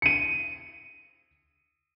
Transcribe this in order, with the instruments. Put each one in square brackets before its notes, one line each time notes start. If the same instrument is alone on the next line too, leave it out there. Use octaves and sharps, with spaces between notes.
[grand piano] C#7 D#7